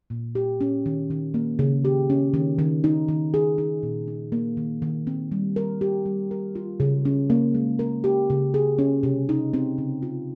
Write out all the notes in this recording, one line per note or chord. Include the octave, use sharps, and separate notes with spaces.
A#2
G4
C#4
D#3
D#3
A#3
C#3
G4
C#4
D#3
D#3
D#4
D#3
G#4
D#4
A#2
D#4
A#3
D#3
D#3
C4
G3
A#4
G4
G3
A#4
F4
C#3
C#4
A#3
G#3
A#4
G4
C#3
G#4
C#4
C3
D#4
C4
C#3
F4